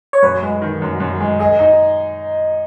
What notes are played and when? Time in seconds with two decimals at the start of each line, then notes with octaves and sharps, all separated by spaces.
0.13 C#5
0.23 F#2 B4
0.42 G#3
0.62 D#3
0.82 F#2
1.00 F#2
1.20 G#3
1.39 G#4 D#5
1.59 D#4